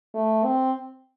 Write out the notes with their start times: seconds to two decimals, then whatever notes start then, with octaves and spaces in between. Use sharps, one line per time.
0.14 A3
0.44 C4